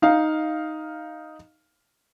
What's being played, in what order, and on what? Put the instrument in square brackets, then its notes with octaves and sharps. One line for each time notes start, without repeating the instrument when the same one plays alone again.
[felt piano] D#4 F5